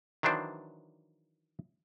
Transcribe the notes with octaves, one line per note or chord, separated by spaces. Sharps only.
D#3 E3 F#3 D4 C5 D5